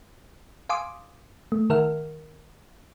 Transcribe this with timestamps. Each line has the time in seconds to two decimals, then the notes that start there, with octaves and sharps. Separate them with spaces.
0.69 F5 G#5 C6 D6 D#6
1.52 A3
1.70 D#3 A#4 E5 F#5 F6